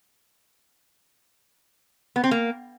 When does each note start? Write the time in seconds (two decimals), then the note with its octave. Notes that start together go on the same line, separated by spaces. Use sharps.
2.16 B3
2.24 C4
2.31 A#3